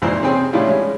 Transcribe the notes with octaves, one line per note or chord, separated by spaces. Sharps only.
G#1 F2 A#2 E3 C5 C6
C3 C4 C#4 G#4 G5 C6
A2 G3 C#4 D4 E4 F4
G#3 C#4